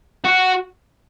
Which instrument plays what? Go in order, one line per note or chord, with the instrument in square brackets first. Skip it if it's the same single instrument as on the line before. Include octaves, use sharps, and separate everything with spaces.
[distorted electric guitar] F#4